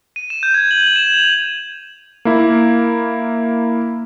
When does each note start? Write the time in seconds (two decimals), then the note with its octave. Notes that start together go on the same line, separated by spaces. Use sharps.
0.16 D#7
0.30 E7
0.43 G6
0.54 G#6
0.71 F#7
0.83 F#7
0.96 E7
1.14 F7
2.25 A#3 E4